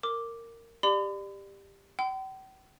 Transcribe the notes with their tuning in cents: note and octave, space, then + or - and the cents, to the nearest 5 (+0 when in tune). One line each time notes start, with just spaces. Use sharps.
A#4 -15 D6 +0
G4 +10 D5 +25 B5 +40
G5 -45 C6 -45